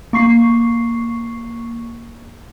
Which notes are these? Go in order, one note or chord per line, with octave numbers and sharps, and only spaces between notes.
A#3 C#6 C7